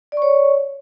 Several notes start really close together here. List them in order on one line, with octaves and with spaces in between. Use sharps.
D5 C#6 C#5